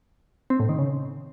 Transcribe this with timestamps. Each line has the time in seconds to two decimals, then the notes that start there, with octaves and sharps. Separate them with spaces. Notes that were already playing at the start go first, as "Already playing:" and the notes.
0.50 C4
0.60 A2
0.69 D#3
0.78 C#3